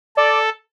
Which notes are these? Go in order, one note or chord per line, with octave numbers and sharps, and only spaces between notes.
A4 D5